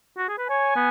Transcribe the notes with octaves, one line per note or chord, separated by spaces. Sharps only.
F#4
G#4
B4
C#5 G#5
B3